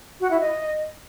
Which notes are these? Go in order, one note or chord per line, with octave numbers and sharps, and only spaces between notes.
F#4
E4
D#5